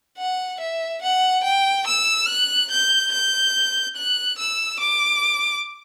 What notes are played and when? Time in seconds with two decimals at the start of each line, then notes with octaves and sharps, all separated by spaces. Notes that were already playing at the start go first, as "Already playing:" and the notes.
0.18 F#5
0.60 E5
1.02 F#5
1.43 G5
1.87 E6
2.27 F#6
2.71 G6
3.12 G6
3.96 F#6
4.38 E6
4.80 D6